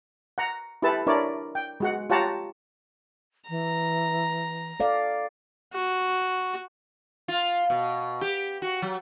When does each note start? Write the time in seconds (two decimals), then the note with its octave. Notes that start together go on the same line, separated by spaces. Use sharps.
0.38 F#5 A#5
0.82 E4 G4 A4 B4 A5
1.07 D4 E4 A#4 C#5 D5
1.55 G5
1.80 G#3 F#4 F#5
2.10 F4 G4 C#5 F#5 A5 A#5
3.49 E3 A#5
4.80 A4 D5 F5
5.73 F#4
7.28 F4
7.70 B2
8.21 G4
8.62 F#4
8.82 F#3